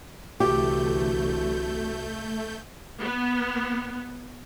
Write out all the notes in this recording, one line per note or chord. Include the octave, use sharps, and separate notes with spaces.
C2 D3 E3 A3 F#4 G4 G6
B3